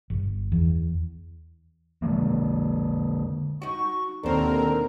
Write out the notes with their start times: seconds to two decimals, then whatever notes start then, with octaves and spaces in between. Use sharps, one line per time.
0.10 G1
0.52 E2
2.02 D3 E3 G#3 A#3
3.62 D#4 F#4 C#6
4.23 D#2 B2 D3 C4 A#4 C5 A#5